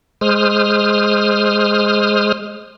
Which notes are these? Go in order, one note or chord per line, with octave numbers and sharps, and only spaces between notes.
G#3 C5 D#6 F6